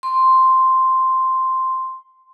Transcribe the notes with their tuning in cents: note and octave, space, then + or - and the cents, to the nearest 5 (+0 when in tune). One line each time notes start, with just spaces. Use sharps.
C6 +0